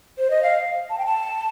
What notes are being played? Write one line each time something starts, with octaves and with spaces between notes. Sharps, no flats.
C5
D#5
F5
A5
G5
A5